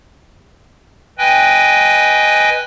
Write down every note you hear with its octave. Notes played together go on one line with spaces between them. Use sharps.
B4 D#5 G5 G#5